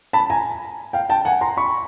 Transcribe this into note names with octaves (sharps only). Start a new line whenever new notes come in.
A5 B5
G#5 A#5
F5 G5
G5 A5
F#5 G#5
A#5 C6
B5 C#6